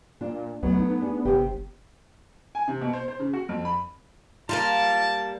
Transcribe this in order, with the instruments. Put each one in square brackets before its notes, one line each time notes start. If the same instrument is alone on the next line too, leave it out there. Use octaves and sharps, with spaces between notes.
[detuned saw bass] A#2 [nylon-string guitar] D4 F4
[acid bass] C#2 [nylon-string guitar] F#3 A3 [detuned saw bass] B3
[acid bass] D#4
[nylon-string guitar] D4 G#4
[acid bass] G1 [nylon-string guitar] C3 G4
[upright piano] G#5
C3
B2
C5
C5
C#3
F#4
F2
B5
[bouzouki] G3 A#3 A#4 [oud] F4 [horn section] A5